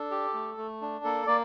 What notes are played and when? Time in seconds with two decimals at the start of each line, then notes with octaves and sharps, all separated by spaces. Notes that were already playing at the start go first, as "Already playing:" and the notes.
Already playing: D4 A4
0.11 G4
0.34 A3
0.57 A3
0.81 D4
1.04 A#3 A4
1.27 A#3 D5